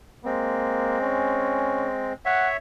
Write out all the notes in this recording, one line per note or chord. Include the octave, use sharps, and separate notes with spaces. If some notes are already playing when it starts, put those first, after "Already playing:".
G#3 A#3 C4
C#4
C#5 E5 F#5